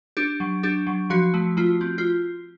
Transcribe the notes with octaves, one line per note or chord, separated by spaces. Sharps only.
D4 G4
F#3
D4 G4
F#3
F3 F#4
A3
A3 F4
C4
F4